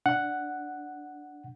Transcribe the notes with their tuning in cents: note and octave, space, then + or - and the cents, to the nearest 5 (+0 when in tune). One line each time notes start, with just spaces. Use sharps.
D4 +0 F#5 +0